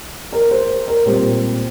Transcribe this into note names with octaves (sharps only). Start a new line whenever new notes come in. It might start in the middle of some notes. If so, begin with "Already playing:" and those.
A#4
C5
A#4
A#2 G3 C4 C5